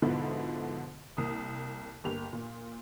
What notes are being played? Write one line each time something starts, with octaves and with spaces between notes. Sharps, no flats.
G#2 B2 D3 F3 B3 E4
C2 A#3 D#6
G1 A#3 G4 F7
A#2